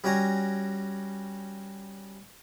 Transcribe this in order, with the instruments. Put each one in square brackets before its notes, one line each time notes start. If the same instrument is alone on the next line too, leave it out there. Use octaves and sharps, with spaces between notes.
[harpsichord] G3 C#4 F#4 G#5 A#5